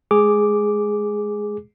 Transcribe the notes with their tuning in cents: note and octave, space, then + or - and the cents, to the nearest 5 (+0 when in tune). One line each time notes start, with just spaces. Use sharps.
G#3 +15 G#4 +0 D6 +0